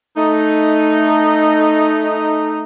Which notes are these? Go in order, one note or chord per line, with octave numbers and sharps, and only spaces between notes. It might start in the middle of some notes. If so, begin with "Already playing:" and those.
A3 D#4